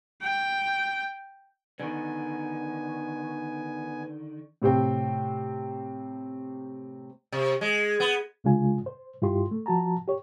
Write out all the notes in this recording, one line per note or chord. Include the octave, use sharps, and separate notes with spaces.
G5
D3 D#3 B3 G#5
A2 C3 C4 G5
C3
G#3
B3
C2 C#3 G#3 D4 F4 G#5
C5
G2 E4 F4 G4 C6
A3
F3 F#4 A5 A#5
G4 C#5